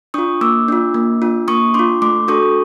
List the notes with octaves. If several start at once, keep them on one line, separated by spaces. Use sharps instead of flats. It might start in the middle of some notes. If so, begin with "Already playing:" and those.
D4 F4 C#6 D#6
A#3 D6 E6
D4 F4
A#3
D4 F4
A#3 C#6 D#6
D4 F4 C6 D6
A3 C6 D6
D4 F#4 A4 C#6 D#6